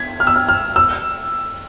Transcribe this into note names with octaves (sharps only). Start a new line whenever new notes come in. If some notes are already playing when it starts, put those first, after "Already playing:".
Already playing: G#6 B6
F6
E6
F6
F6
E6